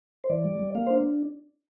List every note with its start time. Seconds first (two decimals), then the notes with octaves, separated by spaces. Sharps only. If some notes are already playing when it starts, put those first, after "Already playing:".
0.24 C5
0.30 E3 D5
0.44 G3
0.59 G3
0.75 A#3 F5
0.87 D4 C5